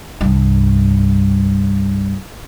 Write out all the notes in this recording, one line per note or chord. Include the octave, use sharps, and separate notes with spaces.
C2 G2